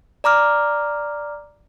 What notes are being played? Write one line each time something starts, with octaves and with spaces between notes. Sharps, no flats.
D5 A#5 D6 F6